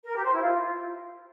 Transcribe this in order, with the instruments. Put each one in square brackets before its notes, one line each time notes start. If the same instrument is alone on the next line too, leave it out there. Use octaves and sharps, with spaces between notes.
[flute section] A#4
G4
C5
E4
F4